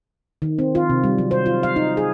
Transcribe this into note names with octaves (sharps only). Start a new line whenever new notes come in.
D#3
C4
F4
C3
G3
F#3
C5
F4
F5
D#4
G#4